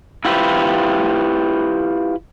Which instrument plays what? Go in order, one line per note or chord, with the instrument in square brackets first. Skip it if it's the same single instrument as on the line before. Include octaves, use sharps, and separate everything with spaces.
[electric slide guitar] E4 F4 G4 B4 C5